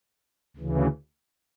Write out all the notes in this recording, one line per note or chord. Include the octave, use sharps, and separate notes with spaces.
D2 C#3 E3